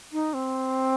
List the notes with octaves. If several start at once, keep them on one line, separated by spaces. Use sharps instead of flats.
D#4
C4